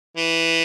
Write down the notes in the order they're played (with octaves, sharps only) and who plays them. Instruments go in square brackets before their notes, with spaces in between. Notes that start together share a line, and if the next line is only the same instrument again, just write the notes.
[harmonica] E3